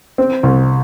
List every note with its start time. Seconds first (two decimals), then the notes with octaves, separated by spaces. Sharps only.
0.18 C4
0.43 C2